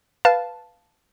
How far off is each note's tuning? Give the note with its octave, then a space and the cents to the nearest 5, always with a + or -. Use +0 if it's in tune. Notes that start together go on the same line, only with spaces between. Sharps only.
B4 +0 F5 +0 A5 -5